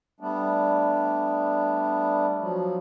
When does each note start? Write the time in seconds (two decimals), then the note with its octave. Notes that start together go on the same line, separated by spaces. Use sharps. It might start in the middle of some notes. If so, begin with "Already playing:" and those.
0.20 G3 A3 B3 D4
2.40 F3 F#3